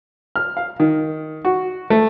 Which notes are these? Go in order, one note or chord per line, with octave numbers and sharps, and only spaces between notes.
F6
F5
D#3
F#4
A3